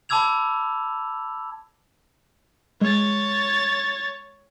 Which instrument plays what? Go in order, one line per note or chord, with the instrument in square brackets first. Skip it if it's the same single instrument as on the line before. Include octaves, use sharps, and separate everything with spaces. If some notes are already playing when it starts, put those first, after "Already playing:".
[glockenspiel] A5 B5 D6 E6 G#6 F7
[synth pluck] G#3 [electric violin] C#5 A6